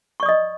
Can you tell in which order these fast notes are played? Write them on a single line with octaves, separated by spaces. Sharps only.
C#6 D5 D#6 D#5